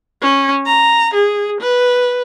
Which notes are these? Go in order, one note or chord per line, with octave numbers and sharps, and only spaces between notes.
C#4
A#5
G#4
B4